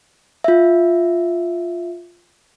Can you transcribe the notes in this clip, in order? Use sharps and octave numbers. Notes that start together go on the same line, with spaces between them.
F4 E5